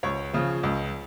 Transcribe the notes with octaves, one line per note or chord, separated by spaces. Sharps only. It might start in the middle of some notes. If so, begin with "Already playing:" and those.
C#2 C#5
C#3 F3
C#2